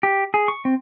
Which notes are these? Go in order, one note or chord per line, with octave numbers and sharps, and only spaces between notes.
G4
G#4
C#6
C4